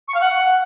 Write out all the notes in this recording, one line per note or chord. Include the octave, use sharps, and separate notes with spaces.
C#6
F5
F#5